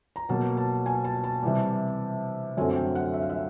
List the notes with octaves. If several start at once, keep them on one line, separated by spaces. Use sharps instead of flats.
A#5
B2 F#3 A#3 A5
A5
G#5
A5
A5
C3 E3 G3
F#2 D3 F#3 A3 C4 G#5
G5
F#5
E5
F5
E5